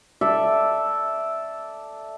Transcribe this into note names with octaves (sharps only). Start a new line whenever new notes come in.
A4 D5 E5